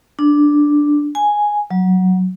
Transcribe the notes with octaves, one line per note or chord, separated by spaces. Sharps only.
D4
G#5
F#3